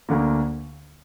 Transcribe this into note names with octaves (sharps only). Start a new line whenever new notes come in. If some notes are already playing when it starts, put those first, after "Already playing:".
D2 D3 A#3